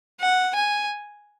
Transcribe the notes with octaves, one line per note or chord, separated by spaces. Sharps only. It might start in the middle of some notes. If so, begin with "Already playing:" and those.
F#5
G#5